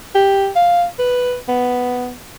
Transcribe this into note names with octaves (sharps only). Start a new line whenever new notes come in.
G4
F5
B4
B3